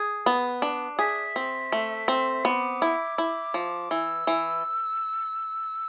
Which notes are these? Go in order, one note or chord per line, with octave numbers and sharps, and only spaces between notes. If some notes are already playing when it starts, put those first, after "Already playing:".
Already playing: G#4
B3
D4
G#4 E5
C4
A3
C4
B3 D6
E4
E4
F3
E3 E6
E3